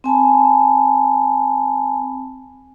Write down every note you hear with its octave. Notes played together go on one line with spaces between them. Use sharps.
C4 G#5 A5 B5